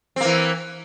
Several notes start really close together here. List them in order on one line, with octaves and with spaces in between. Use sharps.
C4 A#3 E3